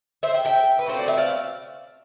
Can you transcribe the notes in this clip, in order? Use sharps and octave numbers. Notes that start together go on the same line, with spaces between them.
C5 E5
E5 G5
E5 G5
B4
B2 A3 C4 F4 C5
D5
E5
D5 F5